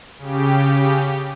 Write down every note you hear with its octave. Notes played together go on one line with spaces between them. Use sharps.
C#3 G4